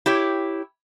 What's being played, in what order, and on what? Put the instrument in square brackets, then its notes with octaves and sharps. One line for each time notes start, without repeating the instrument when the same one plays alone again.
[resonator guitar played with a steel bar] E4 G4 C#5